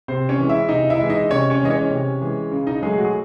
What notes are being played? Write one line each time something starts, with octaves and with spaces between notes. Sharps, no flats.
C3 C4 C5
C#4 C#5
E3 G#3
E4 E5
C3 D#4 D#5
E4 E5
E3 G#3
D#4 D#5
C3 C#4 C#5
C#4 C#5
E3 G#3 D#5
C#4 C#5
C3
E3 G#3
C#3
D#4 D#5
F#3 G#3 A3 G#4
F#4
G#4